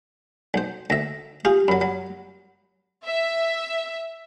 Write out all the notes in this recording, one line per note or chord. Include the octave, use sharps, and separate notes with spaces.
B1 C5
D2 E5 A#6
F4 G4 G#4
F#2 F#3 B5
F#3
E5